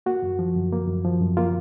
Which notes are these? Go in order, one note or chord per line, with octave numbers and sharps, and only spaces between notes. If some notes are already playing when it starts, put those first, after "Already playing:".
A#3 F#4
F#2
F3
F#2
A#3
F#2
F3
F#2
A#3 F4